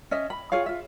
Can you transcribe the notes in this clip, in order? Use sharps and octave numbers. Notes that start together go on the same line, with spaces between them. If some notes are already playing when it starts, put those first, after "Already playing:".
C#4 D#5 E5
B5
F4 G#4 C#5 F5
F4 E5